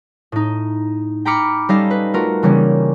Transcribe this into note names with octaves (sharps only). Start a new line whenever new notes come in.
A2 D#4
G5 A#5 B5 D6 F6 C#7
G3 C#4 D#4 A4 D#5 F5
B4
A3 F4 F#4 A#4
C#3 E3 G3 A#3 C#4